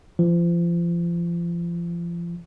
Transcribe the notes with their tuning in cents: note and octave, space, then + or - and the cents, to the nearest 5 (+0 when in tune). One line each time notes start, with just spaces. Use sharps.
F3 -35